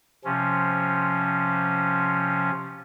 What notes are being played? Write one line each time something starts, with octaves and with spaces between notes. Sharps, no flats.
C3 F3 C#4